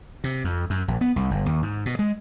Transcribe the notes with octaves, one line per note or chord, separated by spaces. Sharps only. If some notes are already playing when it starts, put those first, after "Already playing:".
C3
F2
F#2
A#1
B3
C2
G1
D#2
G#2
B2
G#3